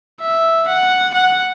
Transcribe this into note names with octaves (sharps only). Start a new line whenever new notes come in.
E5
F#5
F#5